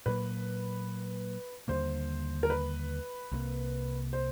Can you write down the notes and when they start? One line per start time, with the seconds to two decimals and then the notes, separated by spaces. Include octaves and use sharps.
0.06 A#2 F#3 A#3 B4
1.68 D#2 D3 G3 A#3 C5
2.43 A#4
2.50 B4
3.32 C2 C3 F3 A#3
4.13 C5